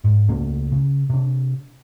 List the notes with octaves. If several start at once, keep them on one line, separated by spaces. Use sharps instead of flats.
G#2
C#2 C#3 A3 A#3
C#3
C3 D4